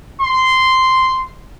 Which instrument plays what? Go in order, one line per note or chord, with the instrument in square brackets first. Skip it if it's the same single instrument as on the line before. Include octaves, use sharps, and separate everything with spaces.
[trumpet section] C6